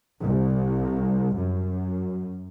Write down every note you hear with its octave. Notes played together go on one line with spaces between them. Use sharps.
C2
F#2